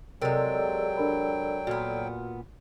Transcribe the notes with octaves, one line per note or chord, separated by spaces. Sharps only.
C3 F#3 G#3 A4 A#4 D5 G5 E6
D4 A#4 B5
A#2 B3 F#4 F6